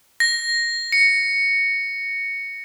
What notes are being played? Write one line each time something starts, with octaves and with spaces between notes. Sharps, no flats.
A#6
C#7